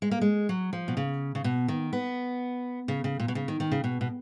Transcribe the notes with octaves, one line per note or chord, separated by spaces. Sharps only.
G#3
A#3
G#3
F#3
F3
B2
C#3
C#3
B2
D#3
B3
C#3
C#3
A#2
B2
C#3
D#3
D#3
C#3
B2
B2